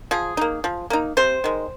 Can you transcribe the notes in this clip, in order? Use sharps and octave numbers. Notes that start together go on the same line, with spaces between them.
F3 G#4
A#3 D#4
F3
A#3 D#4
C3 C5
D#3 G#3